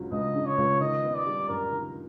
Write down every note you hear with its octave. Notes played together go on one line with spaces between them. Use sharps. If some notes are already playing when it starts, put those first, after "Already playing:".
Already playing: C#2 C#3 F#3
C#2 D#5
C#3
C#5
C#2
D#3 D#5
B3
D5
G3
F#2 A#4
D#3